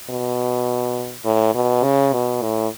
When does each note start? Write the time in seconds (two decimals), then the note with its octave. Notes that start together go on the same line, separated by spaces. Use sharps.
0.10 B2
1.25 A2
1.55 B2
1.84 C#3
2.13 B2
2.42 A2